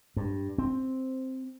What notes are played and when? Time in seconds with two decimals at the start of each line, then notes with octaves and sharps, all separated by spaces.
0.17 G2
0.58 C4